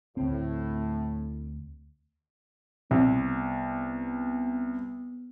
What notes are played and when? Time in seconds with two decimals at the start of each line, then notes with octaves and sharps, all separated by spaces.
0.17 D2 A2 C4
2.91 C2 B3